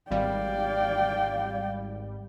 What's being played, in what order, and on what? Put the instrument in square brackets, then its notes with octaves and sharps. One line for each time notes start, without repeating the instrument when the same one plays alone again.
[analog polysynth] G#1 G3 [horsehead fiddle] D5 G5 [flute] F5